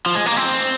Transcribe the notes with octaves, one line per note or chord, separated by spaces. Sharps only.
F3
G#3
A#3
C4